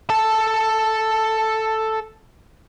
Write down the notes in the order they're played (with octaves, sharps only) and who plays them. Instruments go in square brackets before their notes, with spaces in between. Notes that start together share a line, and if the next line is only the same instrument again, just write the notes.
[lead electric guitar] A4 A5